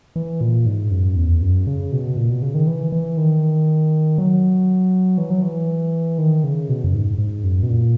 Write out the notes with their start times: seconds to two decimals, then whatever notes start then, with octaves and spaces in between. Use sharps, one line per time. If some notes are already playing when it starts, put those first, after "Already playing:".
0.16 E3
0.41 A#2
0.66 G#2
0.91 F#2
1.16 E2
1.41 F#2
1.67 C#3
1.92 B2
2.17 A#2
2.29 B2
2.42 C#3
2.54 D#3
2.67 E3
2.92 E3
3.17 D#3
4.18 F#3
5.18 E3
5.30 F#3
5.43 E3
6.18 D#3
6.44 C#3
6.69 B2
6.84 F#2
6.94 G#2
7.18 G#2
7.44 F#2
7.63 B2
7.69 A#2